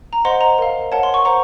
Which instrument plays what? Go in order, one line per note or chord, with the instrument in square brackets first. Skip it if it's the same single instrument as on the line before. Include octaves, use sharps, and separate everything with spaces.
[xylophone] A#5
C5 D#5 F#5 C6
A#5
A#4 F5
A#4 C#5 F#5 A5
C6
C#6
C5 F#5 A#5